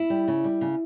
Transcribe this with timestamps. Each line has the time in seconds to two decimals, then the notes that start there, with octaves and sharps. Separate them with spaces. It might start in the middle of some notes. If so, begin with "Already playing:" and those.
Already playing: E4
0.10 G3
0.28 C#3
0.44 G3
0.61 C#3